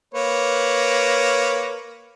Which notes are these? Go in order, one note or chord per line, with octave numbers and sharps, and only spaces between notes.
A#3 B4 C#5